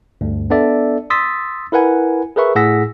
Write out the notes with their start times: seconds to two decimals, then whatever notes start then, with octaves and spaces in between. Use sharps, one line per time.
0.21 D2 G2
0.50 B3 D4 A4 D5 E5
1.10 C6 D#6 E6 A6 B6
1.72 E4 A#4 B4 F#5 G#5
2.36 G#4 A#4 B4 E5 C#6
2.55 A2 G#4 F#5 E6 A#6 B6